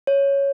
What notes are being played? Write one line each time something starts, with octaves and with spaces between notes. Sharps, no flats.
C#5